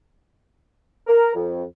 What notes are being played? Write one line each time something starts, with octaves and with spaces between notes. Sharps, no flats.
A#4
F2